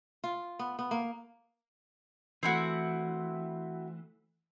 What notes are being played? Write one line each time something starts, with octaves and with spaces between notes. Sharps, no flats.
F4
B3
B3
A#3
E3 A3 C4 E4 F#4